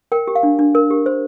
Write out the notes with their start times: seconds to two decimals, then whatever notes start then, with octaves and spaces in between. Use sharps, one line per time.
0.12 A#4 G5
0.27 G4
0.35 F5
0.43 D4
0.59 D4
0.75 A#4
0.91 G4
1.06 C5